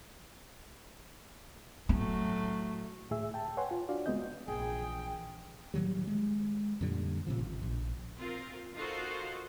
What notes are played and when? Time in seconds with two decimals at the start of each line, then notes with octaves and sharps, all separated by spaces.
1.89 A2 F#3 A3 C#4
3.11 D2 A2 G#4 E5 E6
3.34 G5 A5
3.57 B4 C#5 F#5 G#5 C6
3.71 F4
3.89 D4 F#4 D5 F5
4.06 C#2 G#3 B3 C4 D#5 G6
4.48 A#1 E3 G#4 G5
5.74 A2 D#3 F#3 G3
6.07 G#3
6.81 F2 A#2 D3 G3
7.27 A#2 C#3 F3
7.39 G#1
7.63 A#1
8.17 C4 F4 A#4
8.75 D#4 F4 F#4 A4 A#4 C5